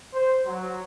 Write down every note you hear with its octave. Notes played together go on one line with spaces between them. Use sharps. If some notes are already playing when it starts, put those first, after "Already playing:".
C5
F#3